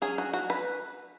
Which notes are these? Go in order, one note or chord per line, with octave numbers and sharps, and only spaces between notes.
F#3 C#4 G#4
F#4
F#4
B4